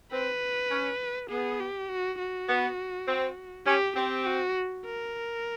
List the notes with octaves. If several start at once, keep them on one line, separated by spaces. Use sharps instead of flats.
C4 B4
C#4
B3 G#4
G4
F#4
F#4
B3
C4
C#4 G4
C4 G4
F#4
A#4